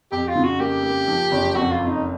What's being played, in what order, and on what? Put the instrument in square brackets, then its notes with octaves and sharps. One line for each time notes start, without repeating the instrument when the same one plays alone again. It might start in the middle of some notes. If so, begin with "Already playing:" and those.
[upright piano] F2 [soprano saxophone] G4
[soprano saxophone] F4
[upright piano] C#3
[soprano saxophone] F#4
[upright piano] A#3 [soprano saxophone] G4
[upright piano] A#3
F3
F#1
[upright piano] F2 [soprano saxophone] F#4
[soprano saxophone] F4
[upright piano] F2
[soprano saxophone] D#4